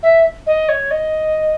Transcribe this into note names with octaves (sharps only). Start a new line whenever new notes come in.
E5
D#5
C#5
D#5